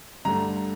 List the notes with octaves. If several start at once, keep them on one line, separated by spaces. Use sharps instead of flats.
G2 D3 A3 A#5